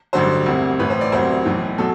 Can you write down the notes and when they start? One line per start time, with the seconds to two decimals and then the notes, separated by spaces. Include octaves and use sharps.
0.13 A1 G2 D3 F#3 C5
0.46 E1 D2 C3
0.79 A1 A2 E3 B4
0.90 C5
1.01 D5
1.12 E1 D2 C3 F#3 C5
1.45 B1 A2 E3
1.78 B2 F#3 A4